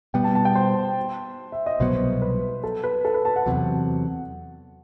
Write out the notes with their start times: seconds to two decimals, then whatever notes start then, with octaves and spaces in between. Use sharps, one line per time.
0.14 B2 G3 B3 G5
0.24 A5
0.35 A5
0.45 G5
0.55 C5
1.52 E5
1.66 D#5
1.80 C2 B2 F#3 B3 C5
2.22 B4
2.64 A4
2.84 B4
3.05 A4
3.14 B4
3.25 A5
3.36 F#5
3.46 E2 C3 F#3